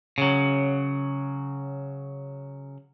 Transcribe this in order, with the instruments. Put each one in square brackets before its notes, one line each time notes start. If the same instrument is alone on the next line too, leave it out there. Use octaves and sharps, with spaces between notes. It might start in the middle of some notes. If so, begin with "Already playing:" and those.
[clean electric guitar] C#3 F#3